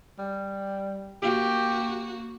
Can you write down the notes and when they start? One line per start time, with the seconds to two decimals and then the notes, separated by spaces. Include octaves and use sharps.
0.19 G3
1.22 A#3 F#4 G4